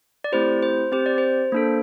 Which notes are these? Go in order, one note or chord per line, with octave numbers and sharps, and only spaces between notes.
D5
A3 C4 E4 G4 C5
C5
C4 G4 C5
D5
C5
A#3 D4 A4